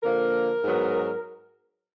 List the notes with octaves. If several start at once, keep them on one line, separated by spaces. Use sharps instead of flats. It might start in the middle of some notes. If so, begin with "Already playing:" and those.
D3 F3 A#3 A#4
G#2 F#3 B3